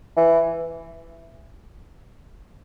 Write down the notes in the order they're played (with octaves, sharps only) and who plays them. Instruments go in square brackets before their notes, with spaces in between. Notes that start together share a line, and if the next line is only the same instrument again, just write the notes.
[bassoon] E3